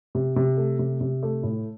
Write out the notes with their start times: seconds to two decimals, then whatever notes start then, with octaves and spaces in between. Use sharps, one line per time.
0.15 C3
0.36 C3
0.57 A3
0.79 C3
1.01 C3
1.23 A3
1.43 A2